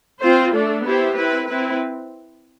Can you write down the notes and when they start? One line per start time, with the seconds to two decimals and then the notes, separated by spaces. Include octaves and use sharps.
0.21 C4 F4 C5
0.53 A3 D4 A4
0.84 B3 E4 G4 C5
1.16 C4 E4 B4
1.48 C4 E4 B4